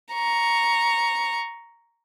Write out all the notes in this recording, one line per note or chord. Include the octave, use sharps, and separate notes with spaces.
A#5 C#6